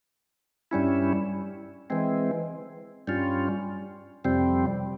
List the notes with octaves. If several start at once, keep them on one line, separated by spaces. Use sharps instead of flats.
G2 G3 C#4 E4
E3 G#3 C4
G2 G3 C#4 F4
F2 C3 G3 C4